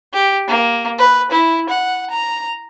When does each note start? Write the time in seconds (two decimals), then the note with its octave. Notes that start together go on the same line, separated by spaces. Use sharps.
0.14 G4
0.48 A#3
0.99 B4
1.31 E4
1.70 F#5
2.11 A#5